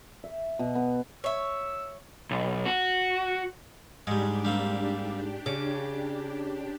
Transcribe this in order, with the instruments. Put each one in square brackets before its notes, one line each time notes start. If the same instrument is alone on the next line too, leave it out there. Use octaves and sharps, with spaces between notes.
[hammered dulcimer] E5
B2
B3
[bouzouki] C#5 E5 [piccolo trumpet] E6
[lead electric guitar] B1
F#4
[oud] G#2 [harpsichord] G3 G#3 [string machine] D4 G4
[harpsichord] G3 A#3 C4
[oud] C#3 [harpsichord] D6